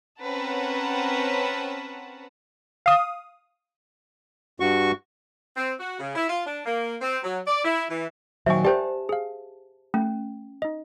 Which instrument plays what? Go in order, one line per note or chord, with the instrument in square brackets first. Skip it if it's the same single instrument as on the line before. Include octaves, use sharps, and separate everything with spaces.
[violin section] C4 C#4 A#4 B4 F#5 A5
[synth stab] F5 D#6
[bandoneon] G2 F#4 C#6
[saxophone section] C4
F#4
C#3
E4
F4
D4
A#3
C4
F#3
D5
E4
E3
[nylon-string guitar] A#2 D#3 F#3 [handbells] C5 F5 C#6 [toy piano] E5 G#5
[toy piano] G4 C5 [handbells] D5 G5 G6 [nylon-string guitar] A5
[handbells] G#4 F5
[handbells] A3 [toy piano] C#4
[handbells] D#4 D#5